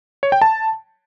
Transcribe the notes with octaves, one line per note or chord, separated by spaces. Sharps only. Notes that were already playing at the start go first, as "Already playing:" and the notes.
C#5
G5
A5